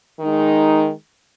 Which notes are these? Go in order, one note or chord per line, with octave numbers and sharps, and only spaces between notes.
D#3 G#3 D#4